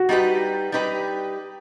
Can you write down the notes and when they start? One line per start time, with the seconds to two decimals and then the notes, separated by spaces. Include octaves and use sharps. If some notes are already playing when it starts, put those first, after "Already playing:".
Already playing: F#4
0.09 G3 D#4 G4 B4
0.72 G3 D#4 G4 B4